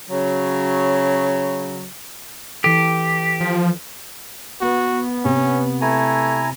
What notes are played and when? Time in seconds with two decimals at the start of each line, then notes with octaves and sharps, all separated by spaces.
0.10 C#3 F#3
2.64 E3 G4 A4
3.41 F3
4.61 B3 F#4
5.25 C3 C#4
5.81 A3 E4 G#5 A#5